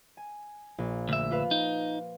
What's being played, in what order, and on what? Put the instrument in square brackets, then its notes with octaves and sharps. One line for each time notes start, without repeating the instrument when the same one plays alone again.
[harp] G#5
A#1
[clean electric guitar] D2 E5
[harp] F4 B4 F5
[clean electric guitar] D#4